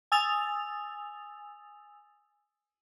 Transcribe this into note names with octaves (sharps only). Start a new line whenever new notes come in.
G#5 D#6 E6 A6 F7